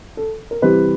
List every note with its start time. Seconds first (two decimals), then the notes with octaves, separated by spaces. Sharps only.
0.17 A4
0.51 A#4
0.62 C3 E3 G3 C4 B4